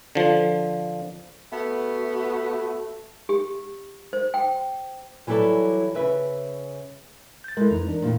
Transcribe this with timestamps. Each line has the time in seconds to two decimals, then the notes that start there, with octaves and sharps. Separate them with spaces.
0.15 D3 F3
1.52 A3 B3 F#4
3.29 G4
4.13 C5
4.34 G5
5.27 E3 F#3 G3 E4 A4 D5
5.95 C#3 B4 E5
7.44 G6 A6
7.57 G#3 E4 A4 A#4
7.71 F2 E3 D#4 A#5
7.88 D4 A#4
8.02 A#2 D#3 A3 A#3 E4